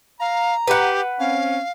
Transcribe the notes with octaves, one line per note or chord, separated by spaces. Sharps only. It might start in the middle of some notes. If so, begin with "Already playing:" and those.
F5 A#5
G4 B4 F#5
C4 C#4 F5